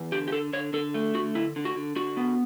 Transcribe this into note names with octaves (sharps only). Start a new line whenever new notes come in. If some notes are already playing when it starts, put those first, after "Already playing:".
Already playing: E2
D3 G4
G4
D3 A4
D3 C#5
D3 A4
A3
D3 F#4
D3 E4
D3
F#4
D3
D3 F#4
B3